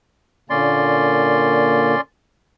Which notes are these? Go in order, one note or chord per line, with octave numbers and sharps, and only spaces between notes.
A#2 D3 A#3 C#4 D5 C6